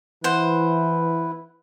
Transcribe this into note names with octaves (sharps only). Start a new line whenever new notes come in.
E3 E4 B4 C5 F#5